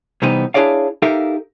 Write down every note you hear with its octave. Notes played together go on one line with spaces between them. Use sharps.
C3 E3 G3 B3 D#4
D4 E4 G#4 C#5 D5 F5
D#4 G4 A4 A#4 E5 F5